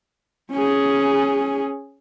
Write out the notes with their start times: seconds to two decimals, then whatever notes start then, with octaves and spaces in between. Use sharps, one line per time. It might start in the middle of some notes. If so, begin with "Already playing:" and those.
0.52 C#4 G#4